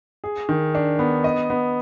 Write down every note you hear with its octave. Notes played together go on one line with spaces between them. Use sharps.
G#4
D#3
D4
B3
D#5
B3